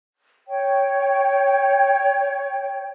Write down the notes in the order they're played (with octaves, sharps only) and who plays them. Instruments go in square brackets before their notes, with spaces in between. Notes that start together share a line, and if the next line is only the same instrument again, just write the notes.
[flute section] C#5 G5